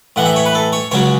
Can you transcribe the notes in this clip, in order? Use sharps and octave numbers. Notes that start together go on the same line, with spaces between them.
A2 E3 F#5
E5
C#5
B4
A4
C#5
C#2 C#3 F#3 C#5